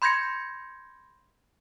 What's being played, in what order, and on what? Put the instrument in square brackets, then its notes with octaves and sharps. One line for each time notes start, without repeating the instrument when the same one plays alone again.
[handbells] B5 C6 G6 G#6 A#6 C#7